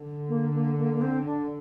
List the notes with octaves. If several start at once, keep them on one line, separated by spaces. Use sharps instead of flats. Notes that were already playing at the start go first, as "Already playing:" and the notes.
Already playing: D3
A#3
A#3
A#3
A#3
C4
D4